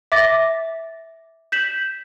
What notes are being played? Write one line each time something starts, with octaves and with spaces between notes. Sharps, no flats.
E5 D6 A6 A#6
G6 B6 E7 F#7